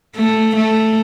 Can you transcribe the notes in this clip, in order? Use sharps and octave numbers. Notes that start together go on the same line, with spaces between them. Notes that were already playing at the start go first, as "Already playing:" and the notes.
A3
A3